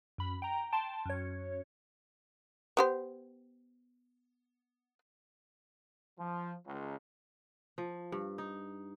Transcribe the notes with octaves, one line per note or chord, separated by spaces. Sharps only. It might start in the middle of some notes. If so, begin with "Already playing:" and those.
F#2 B5
G5 A#5
G5 A5 C6
F#2 C#5
B3 G4 C5
F3
C#2
F3
G2
D#4